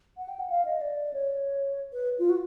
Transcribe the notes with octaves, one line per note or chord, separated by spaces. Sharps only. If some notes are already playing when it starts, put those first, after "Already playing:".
F#5
G5
F#5
F5
D#5
D5
C#5
B4
F4
F#4